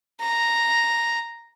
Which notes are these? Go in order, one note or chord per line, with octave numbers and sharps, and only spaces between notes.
A#5